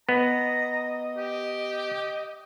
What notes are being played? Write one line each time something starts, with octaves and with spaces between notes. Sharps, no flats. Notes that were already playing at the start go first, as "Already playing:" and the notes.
B3 D#5 A#5
G4